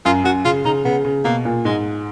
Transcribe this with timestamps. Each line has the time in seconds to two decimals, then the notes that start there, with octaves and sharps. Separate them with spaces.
0.05 F#2 F4
0.24 F#2 F#4
0.45 C#3 F4
0.65 C#3 D#4
0.85 C#3 B3
1.05 C#3
1.25 B2 A#3
1.45 A#2
1.65 G#2 G#3